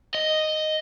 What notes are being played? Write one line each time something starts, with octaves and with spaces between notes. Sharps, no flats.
D#5